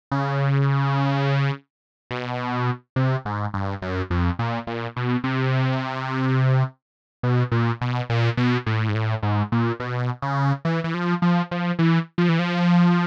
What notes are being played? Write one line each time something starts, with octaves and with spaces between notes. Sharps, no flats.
C#3
B2
C3
G#2
G2
F#2
F2
A#2
A#2
B2
C3
B2
A#2
B2
A#2
B2
A2
G#2
A2
G#2
A#2
B2
C#3
E3
E3
F3
F3
F3
E3
F3
E3
F3